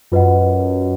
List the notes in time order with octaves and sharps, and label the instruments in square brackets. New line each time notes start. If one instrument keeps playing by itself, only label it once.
[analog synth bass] F#2 [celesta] F4 B4 D#5 F#5